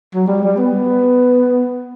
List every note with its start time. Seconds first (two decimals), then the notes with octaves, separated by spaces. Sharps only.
0.14 F#3
0.28 G3
0.43 G3
0.57 B3